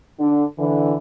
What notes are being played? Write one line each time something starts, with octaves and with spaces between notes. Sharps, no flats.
D3 D4
D3 E3